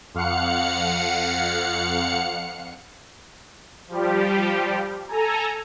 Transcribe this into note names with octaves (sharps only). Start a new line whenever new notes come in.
F2 F5 F#5 C#7
F3 G3 G4
A4 G#5 A#5